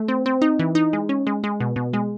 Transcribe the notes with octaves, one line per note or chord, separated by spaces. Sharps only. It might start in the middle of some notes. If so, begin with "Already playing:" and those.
Already playing: A3
C4
C4
D#4
E3
D#4
G#3
C#4
G#3
G#3
B2
B2
G#3